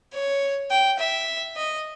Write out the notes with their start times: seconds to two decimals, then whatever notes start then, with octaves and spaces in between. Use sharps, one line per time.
0.13 C#5
0.70 G5
0.99 E5
1.56 D#5